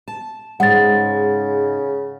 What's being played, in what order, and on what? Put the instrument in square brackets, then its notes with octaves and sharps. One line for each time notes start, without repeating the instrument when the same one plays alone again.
[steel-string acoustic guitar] A5
[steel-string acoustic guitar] G#2 G#3 [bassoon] C#3 [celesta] F#5 A6